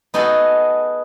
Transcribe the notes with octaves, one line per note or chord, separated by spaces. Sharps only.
B3 D#4 F#4 G#4 A4